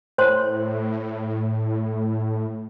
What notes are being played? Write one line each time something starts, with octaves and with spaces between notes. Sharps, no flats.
A2 C5 C#5 C6